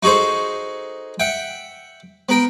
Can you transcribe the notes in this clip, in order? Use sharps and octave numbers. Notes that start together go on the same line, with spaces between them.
D#4 F#4 G#4 A4 C5
E5 F#5 G5
B3 A#4 G5